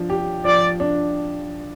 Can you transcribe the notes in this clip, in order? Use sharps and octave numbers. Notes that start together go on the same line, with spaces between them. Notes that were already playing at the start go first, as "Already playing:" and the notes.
Already playing: F3 D4
G4
F3 D5
D4